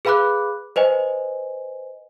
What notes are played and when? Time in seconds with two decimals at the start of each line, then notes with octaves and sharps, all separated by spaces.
0.05 G#4 B4 F5 B5 D6 F#6
0.76 B4 C5 D#5 G#5